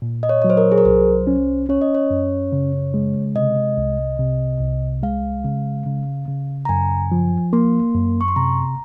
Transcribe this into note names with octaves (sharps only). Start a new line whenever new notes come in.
A#2
D#5
C#5
F#3 C#5
C5
A#4
G#4
A#4
C2 C5
C#4
C#4 C#5
D#5
C#5
F#2
C#3
G#3
C3 D#5
C2
C3
C2
G#3 F5
C#3
C#3
C#3
A#5
F#2 G#5
F3
A#3 C6
F#2
C#6
C6
C3 A#5